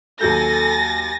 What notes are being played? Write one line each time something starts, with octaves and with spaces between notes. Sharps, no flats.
D#2 F#3 A4 G#5 G6 A6 A#6